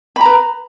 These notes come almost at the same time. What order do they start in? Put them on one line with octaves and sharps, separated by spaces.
B5 A#5 B4